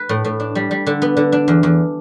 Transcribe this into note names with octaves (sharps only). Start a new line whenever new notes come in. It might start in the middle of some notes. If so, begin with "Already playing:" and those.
Already playing: B4
A2
A2
D4
G3
G3
D3
B3
D3
D4
E2
E2